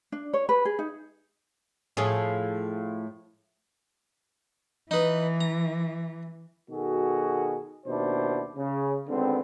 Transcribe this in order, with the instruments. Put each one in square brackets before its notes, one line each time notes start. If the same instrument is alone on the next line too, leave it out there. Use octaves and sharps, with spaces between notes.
[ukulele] D4
C#5
B4
G#4
D#4
[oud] A2 F3 G#4
[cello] E3 [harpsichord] D#4 B4
[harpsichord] A#5
[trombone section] B2 D#3 F#4 G#4 A4
D#2 B2 D4 E4 C5
C#3
G#1 D3 B3 C4